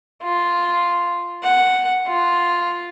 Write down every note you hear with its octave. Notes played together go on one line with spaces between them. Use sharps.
F4
F#5
F4